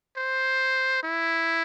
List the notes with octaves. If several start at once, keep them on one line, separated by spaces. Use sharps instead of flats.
C5
E4